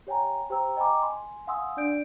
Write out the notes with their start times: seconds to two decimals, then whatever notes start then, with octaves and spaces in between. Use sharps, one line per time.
0.07 G4 C#5 G5 G#5 A#5
0.50 G4 C5 G5 A#5 E6
0.77 D#5 G5 G#5 A#5 B5 D6
1.02 G#5 C6
1.47 F5 F#5 G#5 C6 D#6 E6
1.77 D4 D5 G6 D7